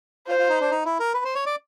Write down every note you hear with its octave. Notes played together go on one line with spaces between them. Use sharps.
F4 C5
F4
D#4
D4
D#4
E4
A#4
B4
C5
C#5
D5